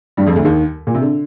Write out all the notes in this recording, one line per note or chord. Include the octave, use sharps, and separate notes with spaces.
G2 G3
F2 F3
D2 D3
D#2 D#3
A#2
C3
D3